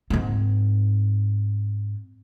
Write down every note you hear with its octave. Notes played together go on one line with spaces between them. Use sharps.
G#2 C4